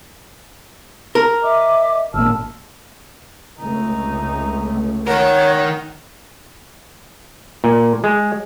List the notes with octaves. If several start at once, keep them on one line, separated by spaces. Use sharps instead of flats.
A#4
D#5 E5 D6
G#1 A#2 A5 E6 F6
F1 C#2 A3 D#4
D#3 A#4 C#5 F#5
A#2
G#3